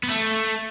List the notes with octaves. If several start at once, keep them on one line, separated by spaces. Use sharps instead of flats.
B3
A3